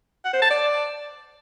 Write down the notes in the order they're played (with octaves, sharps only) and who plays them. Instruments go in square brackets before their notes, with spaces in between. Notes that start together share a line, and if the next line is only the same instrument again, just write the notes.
[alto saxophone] F#5
C5
A5
D5